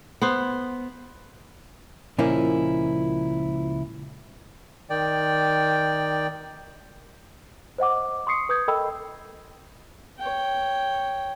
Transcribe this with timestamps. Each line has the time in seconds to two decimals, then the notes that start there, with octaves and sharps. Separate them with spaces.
0.22 B3 C5
2.18 C#2 A#2 F3 A#3 C#4 E4
4.90 D#3 D5 G5
7.78 C5 D#5 F#5 D6
8.27 C6 C#6 D#6 C7 C#7
8.49 B4 D#6 G6 G#6
8.68 A4 A#4 D#5 G5 B5 E6
10.19 C#5 G5